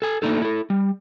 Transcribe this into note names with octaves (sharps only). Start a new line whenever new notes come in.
A4 G#5
A3 A#3 D4 D#4 A4
E4 A4
G3